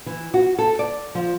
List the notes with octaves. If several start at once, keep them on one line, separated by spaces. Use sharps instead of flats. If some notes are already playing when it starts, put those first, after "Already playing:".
E3
F#4
A4
D5
F3